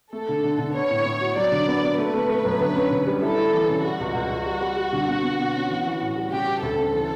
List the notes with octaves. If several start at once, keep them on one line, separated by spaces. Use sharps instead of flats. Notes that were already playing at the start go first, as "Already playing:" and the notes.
A3 A4
D3
D3
D3
B3 C#5
A2
A2
F#4
F#3 D5
D3
B3
B3
A3 B4
A3
A3
F#2
D3
C#4
D3
G3
E4 A4
E4
E3
C#3
G3 F#4
C#2
C#2
C#2
G3
G3
G3
D3
B2
B2
B2
C#4
E3
E3
A2
G3
C#3 G4
G3
D2 A4
C#3
E3